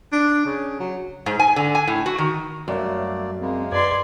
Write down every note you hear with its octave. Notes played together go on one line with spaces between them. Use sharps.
D4
C#3
F#3
G#2
G#5
D3
G#5
A2
F#4
D#3
F#2 G3 A3 A#3 D5
C#3 G#3 A#3 C4
F#2 B4 D5 C6 G#6